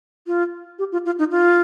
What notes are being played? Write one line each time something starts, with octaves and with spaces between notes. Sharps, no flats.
F4
G4
F4
F4
D#4
F4